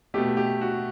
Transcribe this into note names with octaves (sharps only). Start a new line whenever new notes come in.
B2 A3 G4
G4
F#4